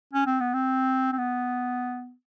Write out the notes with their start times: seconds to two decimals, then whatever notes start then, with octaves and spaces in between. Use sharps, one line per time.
0.13 C#4
0.27 C4
0.41 B3
0.54 C4
1.13 C4
1.18 B3